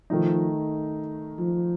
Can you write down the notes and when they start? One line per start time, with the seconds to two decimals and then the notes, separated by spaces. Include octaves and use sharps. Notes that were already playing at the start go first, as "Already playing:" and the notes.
0.10 D#3 F3 A3 D#4
1.39 F3